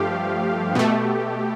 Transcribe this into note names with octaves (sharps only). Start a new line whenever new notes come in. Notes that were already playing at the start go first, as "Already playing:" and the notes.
Already playing: G2 F3 A3 G4 F5
B2 A3